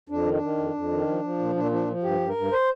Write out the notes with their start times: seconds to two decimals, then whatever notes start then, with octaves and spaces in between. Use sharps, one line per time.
0.09 F2 D4
0.26 D#3
0.34 D4
0.42 D#3
0.57 F2
0.74 F2
0.91 D#3
1.07 F3
1.23 F3
1.39 A#2
1.55 A#2 D4
1.71 F3 D4
1.88 F3
2.03 G2 G4
2.20 G2
2.29 A#4
2.36 G2
2.52 C5